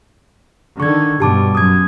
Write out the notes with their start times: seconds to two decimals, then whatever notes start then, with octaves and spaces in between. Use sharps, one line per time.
0.80 D3 D#3 C#6 G#6
1.20 G2 B2 G4 A5 D6
1.55 F#2 D#6 G#6